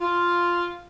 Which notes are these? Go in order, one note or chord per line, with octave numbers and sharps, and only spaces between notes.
F4